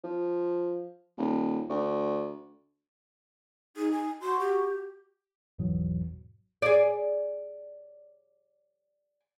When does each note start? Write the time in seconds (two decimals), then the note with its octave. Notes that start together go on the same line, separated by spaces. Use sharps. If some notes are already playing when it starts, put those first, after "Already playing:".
0.04 F3
1.17 D#1
1.70 D2
3.76 D#4 G#4
3.92 G#5
4.21 F#4 C6
4.40 G4
5.59 G#1 E2 G#2 B2 E3 F#3
6.62 G#4 D5